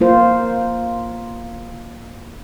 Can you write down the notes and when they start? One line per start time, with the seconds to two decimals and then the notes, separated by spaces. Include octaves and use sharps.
0.01 A#3 F4 C5